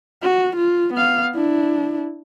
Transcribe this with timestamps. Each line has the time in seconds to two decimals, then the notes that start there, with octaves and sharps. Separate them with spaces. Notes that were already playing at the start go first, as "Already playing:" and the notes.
0.23 F#4
0.56 F4
0.94 B3 F5
1.35 D4 E4